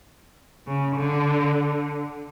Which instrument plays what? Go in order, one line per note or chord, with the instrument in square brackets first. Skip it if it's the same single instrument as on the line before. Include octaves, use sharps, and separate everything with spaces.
[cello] C#3
D3